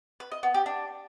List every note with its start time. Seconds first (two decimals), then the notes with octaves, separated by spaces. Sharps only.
0.20 B4
0.32 D#5
0.43 B3
0.54 G4
0.66 D4